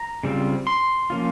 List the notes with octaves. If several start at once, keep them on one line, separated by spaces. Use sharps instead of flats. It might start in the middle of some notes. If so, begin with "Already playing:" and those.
Already playing: A#5
C#3 G3 C4 F4
C6
F3 A#3 C#4 F4